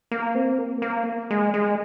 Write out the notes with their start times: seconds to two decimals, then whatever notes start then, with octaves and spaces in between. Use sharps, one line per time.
0.11 A#3
0.35 C4
0.59 A#3
0.82 A#3
1.31 G#3
1.54 G#3